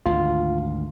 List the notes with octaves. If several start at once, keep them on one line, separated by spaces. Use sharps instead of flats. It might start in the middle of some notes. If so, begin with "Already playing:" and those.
G#1 D2 F4